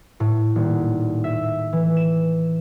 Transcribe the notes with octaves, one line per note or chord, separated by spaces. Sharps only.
A2
D#1
E5
E3
E7